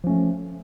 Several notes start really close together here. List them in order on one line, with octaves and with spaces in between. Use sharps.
F3 C#4 A3